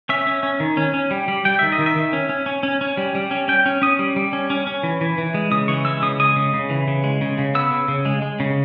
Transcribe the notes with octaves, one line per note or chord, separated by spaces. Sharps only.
C#4 E5
C#4
C#4
D#3
C#4
C#4
G3
G3
G3 G5
D#3 E5
D#5
D#3
E5
D#3
C#4
C#4
C#4
C#4
C#4
G3
G3
C#4
C#4 G5
C#4
C#4 D#6
G3
G3
C#4
C#4
C#4
E3
E3
E3
G#3
C#3 D#6
E3 C#6
G#3 E6
C#3 D#6
G#3 D#6
C#3
C#3
E3
C#3
G#3
C#3
C#3
B3 E6
C#3
C#3
G#3
G#3
C#3